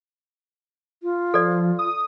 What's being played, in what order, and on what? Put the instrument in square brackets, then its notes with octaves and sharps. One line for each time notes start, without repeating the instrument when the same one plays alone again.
[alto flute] F4
[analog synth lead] F3 [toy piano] A4 D5
[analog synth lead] D#6